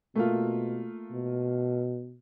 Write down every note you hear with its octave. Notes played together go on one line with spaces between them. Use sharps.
B2 A3 A#3 F4
B2